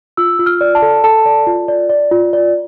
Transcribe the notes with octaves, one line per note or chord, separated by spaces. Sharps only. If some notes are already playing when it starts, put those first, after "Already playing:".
F4 E6
F4
F6
D5
A5
A4
A4 A5
D5
F4
D5
D5
F4
D5